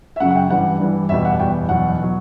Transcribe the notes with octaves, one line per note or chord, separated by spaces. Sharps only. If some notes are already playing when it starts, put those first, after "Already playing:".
E5
F#2 C#3 F#3 F#5
F#5
G5
G2 E3 G3 F#5
G2 E3 G3
E2 B2 G3 E5
F#5
E2 B2 G3 G5
E2 B2 F#3 F#5
B2 F#3